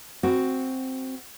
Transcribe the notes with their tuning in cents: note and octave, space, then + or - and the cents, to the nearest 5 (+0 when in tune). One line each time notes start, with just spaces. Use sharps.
C4 +0 F#4 +0